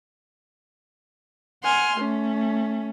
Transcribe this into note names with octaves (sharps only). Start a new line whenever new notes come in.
F#5 G#5 C6 F6
A3 C#4